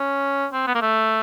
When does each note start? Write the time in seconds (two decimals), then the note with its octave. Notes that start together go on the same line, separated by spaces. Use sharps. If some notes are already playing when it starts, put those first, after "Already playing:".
Already playing: C#4
0.53 C4
0.67 B3
0.75 A#3
0.82 A3